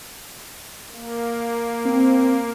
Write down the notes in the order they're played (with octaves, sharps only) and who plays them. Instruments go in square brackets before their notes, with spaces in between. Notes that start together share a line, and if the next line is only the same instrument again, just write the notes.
[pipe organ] A#3
[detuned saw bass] C4